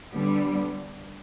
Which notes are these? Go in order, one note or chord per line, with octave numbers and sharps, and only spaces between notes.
D3 G3 B3